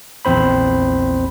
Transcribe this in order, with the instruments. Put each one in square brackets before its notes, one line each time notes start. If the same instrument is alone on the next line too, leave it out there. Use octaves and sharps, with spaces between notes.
[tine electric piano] A#1 E2 C4 C5 B5